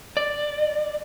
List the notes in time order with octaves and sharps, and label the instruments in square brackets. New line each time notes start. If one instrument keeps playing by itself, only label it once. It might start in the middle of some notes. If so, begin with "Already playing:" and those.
[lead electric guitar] D5